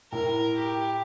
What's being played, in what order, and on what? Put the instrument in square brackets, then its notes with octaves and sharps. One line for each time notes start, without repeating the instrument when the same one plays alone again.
[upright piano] A2 [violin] A#4
[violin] G4